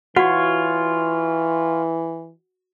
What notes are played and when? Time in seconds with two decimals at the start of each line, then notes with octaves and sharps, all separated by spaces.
0.16 E3 F4 F#4 C#5 F#5